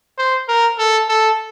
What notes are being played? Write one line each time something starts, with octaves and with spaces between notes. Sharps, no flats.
C5
A#4
A4
A4